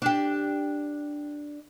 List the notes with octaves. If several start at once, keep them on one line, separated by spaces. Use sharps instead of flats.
D4 G4